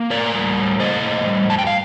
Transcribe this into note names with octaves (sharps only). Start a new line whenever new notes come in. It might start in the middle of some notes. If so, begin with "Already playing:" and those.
Already playing: A#3
A2 A#4 D5
G3
A2
A#3 C5 D#5
A2
G3
G2 A5
G5
F5